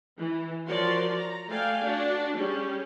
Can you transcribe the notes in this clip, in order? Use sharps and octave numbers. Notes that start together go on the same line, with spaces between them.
E3
F3 F#4 A#4 C#5 D5 C6
A#5
A3 A4 D5 F5 G5 G#5
D4 F#4
G3 C#4 G4 G#4